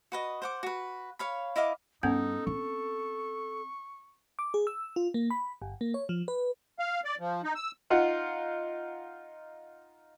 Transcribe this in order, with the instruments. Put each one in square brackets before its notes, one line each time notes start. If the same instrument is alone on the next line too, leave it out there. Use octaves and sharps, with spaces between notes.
[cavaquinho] F#4 B4 D#5
C5 F#5 D6
F#4 B4
C#5 F5 B5
E4 D#5 F5 D6
[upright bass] G2 [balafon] B3 C#4 F#5 [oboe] D#4 [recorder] A4
[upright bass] C4 [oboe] C#6
[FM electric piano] D6
G#4
E6
F4
A#3
B5
G1
A#3
C#5
F3
B4
[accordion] F5
D5
F3
D#4
E6
[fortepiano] D#4 F4 F#5